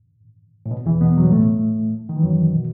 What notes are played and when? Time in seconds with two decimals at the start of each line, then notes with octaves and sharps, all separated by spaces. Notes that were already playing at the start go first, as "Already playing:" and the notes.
0.66 A2
0.71 B2
0.86 E2 E3
1.01 B2 B3
1.17 F#3
1.24 G3
1.32 A2 A3
2.09 D#3
2.16 E3
2.23 F#2 F#3
2.54 B2